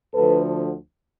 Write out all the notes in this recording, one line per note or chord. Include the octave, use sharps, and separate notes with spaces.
D2 D3 F3 A4 B4